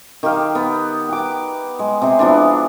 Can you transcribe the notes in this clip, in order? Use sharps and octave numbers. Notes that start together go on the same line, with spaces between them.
D#3 G4 F5
B3
G5 D6
G#3
C3 G#4
E3 F3 B3 D4